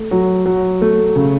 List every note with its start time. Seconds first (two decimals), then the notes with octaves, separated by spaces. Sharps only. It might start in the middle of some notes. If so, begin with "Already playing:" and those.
Already playing: A3
0.11 F#3
0.46 F#3
0.81 A3
1.16 C#3